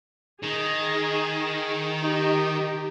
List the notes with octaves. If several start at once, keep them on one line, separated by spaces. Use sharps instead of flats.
D#3 G#4
D#4 G4